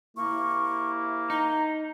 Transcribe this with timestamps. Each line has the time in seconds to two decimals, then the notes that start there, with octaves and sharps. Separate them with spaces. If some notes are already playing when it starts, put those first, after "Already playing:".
0.17 C3 A#3 E4 C#6
1.30 D#4 A#5